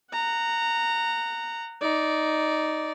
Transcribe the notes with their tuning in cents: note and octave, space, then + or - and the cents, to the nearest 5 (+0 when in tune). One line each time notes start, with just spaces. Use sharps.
F#5 +0 A#5 -15
D#4 +0 D5 -10